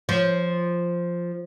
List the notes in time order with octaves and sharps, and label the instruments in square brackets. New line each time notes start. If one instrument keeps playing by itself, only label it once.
[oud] F3